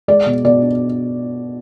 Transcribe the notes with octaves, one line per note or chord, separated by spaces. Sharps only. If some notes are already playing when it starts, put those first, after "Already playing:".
G#3 D5
B2
B2 D5
D4